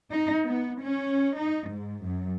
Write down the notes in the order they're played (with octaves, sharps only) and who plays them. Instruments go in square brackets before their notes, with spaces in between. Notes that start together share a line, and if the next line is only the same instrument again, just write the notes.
[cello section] D#4
B3
C#4
D#4
G#2
F#2